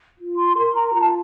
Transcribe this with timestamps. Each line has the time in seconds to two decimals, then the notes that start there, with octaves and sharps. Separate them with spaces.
0.19 F4
0.38 C6
0.56 A#4 C6
0.75 A#5
0.94 F4 A#5
1.01 A5